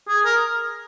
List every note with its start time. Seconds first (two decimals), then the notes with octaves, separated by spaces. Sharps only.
0.08 G#4
0.25 A#4